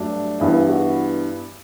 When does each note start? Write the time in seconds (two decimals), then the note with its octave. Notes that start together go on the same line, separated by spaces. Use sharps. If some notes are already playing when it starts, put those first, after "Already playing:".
Already playing: G2 F#3 A3 D4
0.40 G2 E3 B3 E4
0.69 F#4